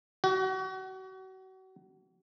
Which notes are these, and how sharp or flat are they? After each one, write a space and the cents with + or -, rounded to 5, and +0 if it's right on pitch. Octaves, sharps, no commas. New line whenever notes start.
F#4 +35